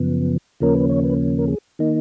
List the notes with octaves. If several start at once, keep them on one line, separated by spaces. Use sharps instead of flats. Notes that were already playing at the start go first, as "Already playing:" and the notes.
Already playing: F#2 C#3 F3 B3
D#2 C#3 F3 A#3 C#4 A#4
B4
C#5
B4
A#4
G#4
D#3 A#3 D#4